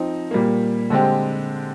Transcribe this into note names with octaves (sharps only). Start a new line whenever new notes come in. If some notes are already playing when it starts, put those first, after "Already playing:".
Already playing: F3 C4 D#4
A#2 G3 A#3
D3 G#3 C4 G4